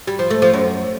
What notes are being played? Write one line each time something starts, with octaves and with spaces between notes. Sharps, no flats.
G3
F3
A3
F3
F#2